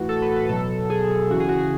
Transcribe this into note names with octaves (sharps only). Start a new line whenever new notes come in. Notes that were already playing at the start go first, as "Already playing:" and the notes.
Already playing: A2 E3 F#4
A4
B4
B4
B2 F#3 A4
G#4
C#3 E3 F#4
G#4
F#4
G#4